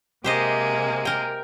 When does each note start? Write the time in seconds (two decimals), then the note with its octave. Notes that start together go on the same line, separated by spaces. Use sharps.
0.24 C3 G#3 A#3 G4 C5 D#5
1.05 A#4 G5